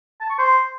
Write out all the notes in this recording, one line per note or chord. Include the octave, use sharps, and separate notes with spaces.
A5
C#6
C5